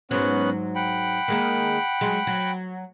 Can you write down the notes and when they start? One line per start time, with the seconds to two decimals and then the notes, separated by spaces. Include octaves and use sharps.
0.11 G#2 F#3 B3 C#4 F#6
0.75 F#5 G5 B5
1.28 D#3 G#3 A#3
2.01 F#3 G#3
2.27 F#3